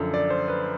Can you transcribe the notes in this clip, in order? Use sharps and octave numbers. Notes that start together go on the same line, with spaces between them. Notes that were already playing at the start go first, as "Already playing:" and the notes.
Already playing: F#2 D3 F3
D5
C5
B4